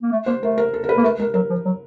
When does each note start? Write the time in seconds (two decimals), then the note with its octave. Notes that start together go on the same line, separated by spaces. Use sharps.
0.02 A#3
0.12 A3
0.26 A#3 C5
0.43 A3 A#4
0.58 A#4
0.74 A4
0.84 A#4
0.89 B4
0.97 A#3 A4
1.04 A3 A#4
1.19 G#3 A#4
1.34 F#3 A#4
1.50 F3
1.65 F#3